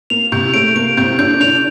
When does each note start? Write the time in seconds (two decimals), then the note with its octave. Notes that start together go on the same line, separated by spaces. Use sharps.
0.10 A#3 F7
0.32 C3 C4 G6
0.54 A3 D7
0.76 A#3 D7
0.97 C3 C4 G6
1.19 D3 D4 G6
1.40 D3 D4 F7